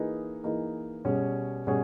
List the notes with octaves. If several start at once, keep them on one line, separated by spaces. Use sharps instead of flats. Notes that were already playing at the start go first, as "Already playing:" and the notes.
Already playing: E3 A#3 D#4 G#4 B4
E3 A#3 D#4 G#4 B4
B2 G3 C#4 G#4 C#5
B2 G3 C#4 G#4 C#5